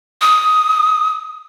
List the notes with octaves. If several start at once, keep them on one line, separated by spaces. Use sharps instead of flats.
D#6